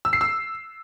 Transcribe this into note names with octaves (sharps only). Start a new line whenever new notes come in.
E6
C7
E6